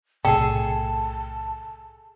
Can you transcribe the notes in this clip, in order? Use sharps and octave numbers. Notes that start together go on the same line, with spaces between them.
B1 A2 C3 G#4 A4 G5 A5